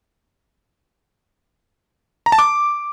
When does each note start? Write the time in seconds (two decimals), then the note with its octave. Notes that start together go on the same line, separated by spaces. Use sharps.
2.26 A#5
2.32 A5
2.39 D6